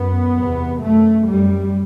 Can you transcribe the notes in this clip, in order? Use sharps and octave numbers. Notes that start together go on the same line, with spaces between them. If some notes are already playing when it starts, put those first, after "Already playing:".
Already playing: F#2 B3
E2 C3
F#2 A3
F#2 G3